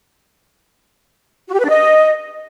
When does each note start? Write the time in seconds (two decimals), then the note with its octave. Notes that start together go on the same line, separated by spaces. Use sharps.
1.48 F#4
1.54 G4
1.59 B4
1.64 D4
1.69 D#5